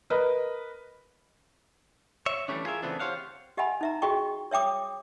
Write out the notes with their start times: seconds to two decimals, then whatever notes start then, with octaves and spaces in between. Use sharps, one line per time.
0.10 A#4 B4 D#5
2.26 C#5 E5
2.48 E3 G3 A3 C#4 D4
2.65 F4 G#4 A#4 E5
2.82 C#3 E3 A3 B3 C4 D4
2.99 G4 C5 C#5 F5 F#5
3.57 G4 D#5 E5 F#5 G#5 B5
3.81 D#4 E5 A#5
4.02 F4 F#4 G#4 D#5 G5 C#6
4.51 C#5 E5 G5 D6 D#6